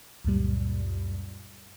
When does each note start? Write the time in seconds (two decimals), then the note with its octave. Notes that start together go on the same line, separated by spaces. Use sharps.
0.25 C#2 F#2 A#2 G3